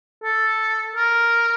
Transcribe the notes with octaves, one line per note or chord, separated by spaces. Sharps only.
A4
A#4